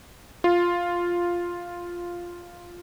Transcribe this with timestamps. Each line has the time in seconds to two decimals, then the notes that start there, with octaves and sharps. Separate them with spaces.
0.44 F4